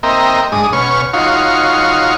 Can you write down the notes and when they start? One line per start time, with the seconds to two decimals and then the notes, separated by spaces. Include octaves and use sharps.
0.03 A#3 C4 A#4 D#5 E5 G5
0.52 G#2 G#3 D4 D#6
0.73 B2 C#4 C#5 F6
1.13 D#4 F4 F#4 C#5 F5